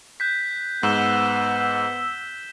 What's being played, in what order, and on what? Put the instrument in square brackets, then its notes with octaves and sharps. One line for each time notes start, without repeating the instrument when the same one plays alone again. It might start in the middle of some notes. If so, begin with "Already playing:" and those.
[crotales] F#6 G6 B6
[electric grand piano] G#2 [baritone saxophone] B3 [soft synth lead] E6 [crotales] B6 E7 G7